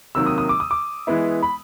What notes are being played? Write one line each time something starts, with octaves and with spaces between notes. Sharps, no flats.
C3 D#3 F#3 A#3 E6
D#6
D#6
D6
D#6
D6
E3 G#3 B3 E4
B5